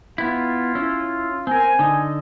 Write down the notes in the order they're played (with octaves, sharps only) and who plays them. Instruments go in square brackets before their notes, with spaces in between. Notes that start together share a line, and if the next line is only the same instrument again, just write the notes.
[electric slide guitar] B3 E4 [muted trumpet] F4
[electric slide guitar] C#4 E4
[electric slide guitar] C4 A#4 [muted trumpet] G#5
[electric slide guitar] D3 D#4